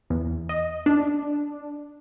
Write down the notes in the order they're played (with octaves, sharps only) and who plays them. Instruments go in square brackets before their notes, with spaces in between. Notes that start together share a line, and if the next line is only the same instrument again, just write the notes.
[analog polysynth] E2
D#5
D4